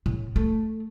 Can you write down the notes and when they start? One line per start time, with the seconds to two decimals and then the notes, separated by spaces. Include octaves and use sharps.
0.06 A2
0.36 A3